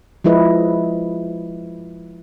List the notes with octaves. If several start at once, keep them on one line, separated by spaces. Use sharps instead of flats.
F3 G#3 E4 B4 D#5